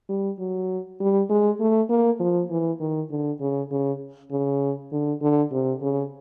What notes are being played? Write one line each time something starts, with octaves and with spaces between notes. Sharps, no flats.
G3
F#3
G3
G#3
A3
A#3
F3
E3
D#3
D3
C#3
C#3
C#3
D3
D3
C3
C#3